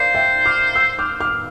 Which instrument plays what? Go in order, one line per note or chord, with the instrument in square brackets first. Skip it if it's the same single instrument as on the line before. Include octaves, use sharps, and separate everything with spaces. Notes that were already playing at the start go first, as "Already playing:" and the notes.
Already playing: [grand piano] A#4 D5 F5 [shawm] C5
[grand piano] E5 G5
D6 F6
E6 G6
D6 F6
D6 F6